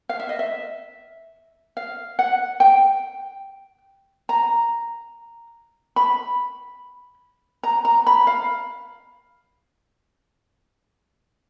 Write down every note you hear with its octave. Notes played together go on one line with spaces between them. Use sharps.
F5
E5
D#5
E5
F5
F#5
G5
A#5
B5
A#5
A#5
B5
F5